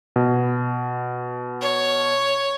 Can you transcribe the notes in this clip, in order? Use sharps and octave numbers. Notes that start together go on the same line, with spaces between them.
B2
C#5